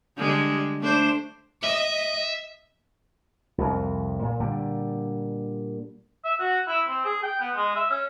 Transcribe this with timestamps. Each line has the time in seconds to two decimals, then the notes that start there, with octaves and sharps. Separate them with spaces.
0.17 D3 G3 G#3
0.81 A3 D4 C5
1.63 D#5 E5
3.58 C2 F2
4.23 A#2
4.40 A#2 D3 G3
6.24 E5
6.40 F#4
6.68 E4
6.88 C4
7.05 G#4
7.23 G5
7.40 B3
7.56 G#3
7.76 E5
7.90 C#4